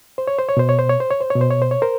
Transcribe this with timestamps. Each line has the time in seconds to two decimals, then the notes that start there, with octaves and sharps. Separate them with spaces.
0.18 C5
0.27 C#5
0.39 C5
0.49 C#5
0.57 B2 C5
0.69 C#5
0.79 C5
0.89 C#5
1.00 C5
1.11 C#5
1.20 C5
1.30 C#5
1.36 B2
1.41 C5
1.51 C#5
1.62 C5
1.71 C#5
1.82 A#4 C5